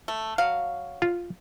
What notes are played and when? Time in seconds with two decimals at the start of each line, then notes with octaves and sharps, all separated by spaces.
0.08 A3
0.38 F#3 F5
1.02 F4